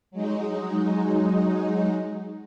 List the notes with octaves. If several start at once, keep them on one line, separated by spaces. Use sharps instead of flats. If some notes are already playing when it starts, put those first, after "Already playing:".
F#3 G#3 D#4